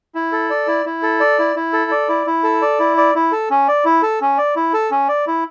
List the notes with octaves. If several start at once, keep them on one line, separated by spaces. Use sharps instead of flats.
E4
A4
D5
E4
E4
A4
D5
E4
E4
A4
D5
E4
E4
A4
D5
E4
D5
E4
A4
C#4
D5
E4
A4
C#4
D5
E4
A4
C#4
D5
E4